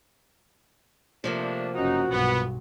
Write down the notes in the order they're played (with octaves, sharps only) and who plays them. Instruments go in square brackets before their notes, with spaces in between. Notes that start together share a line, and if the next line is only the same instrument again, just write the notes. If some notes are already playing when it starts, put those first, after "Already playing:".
[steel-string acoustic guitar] C3 F3 A#3 [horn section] A3 D4
[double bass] F#1 C#4 [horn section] D#4 [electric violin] F#4
[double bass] B1 G2 [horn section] B3